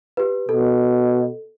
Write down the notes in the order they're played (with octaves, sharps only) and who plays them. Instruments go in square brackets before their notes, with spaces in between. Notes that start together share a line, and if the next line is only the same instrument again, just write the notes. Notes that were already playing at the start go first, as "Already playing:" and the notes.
[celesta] G4 B4
[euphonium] B2 [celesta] A4